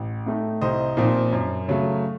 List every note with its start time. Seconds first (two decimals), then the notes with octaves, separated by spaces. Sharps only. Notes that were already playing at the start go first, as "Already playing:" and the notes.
Already playing: A1
0.26 A2 A3 D#4
0.61 C2 C5 D#5
0.97 A#2 F3 C4 D#4
1.32 F#2
1.68 C#3 F#3 A3